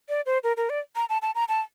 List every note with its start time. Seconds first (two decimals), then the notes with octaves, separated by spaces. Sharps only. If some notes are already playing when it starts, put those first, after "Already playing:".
0.09 D5
0.26 C5
0.44 A#4
0.57 A#4
0.70 D5
0.96 A#5
1.09 A5
1.22 A5
1.35 A#5
1.49 A5